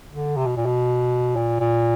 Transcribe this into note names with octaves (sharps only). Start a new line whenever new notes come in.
D3
C3
B2
A#2
B2
A#2
A#2